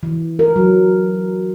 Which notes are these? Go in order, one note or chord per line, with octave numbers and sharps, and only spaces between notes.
E3
A#4
F#3